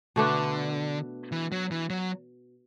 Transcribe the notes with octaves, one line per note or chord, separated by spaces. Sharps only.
B2 D3 A3 D4 B4
E3
F#3
E3
F#3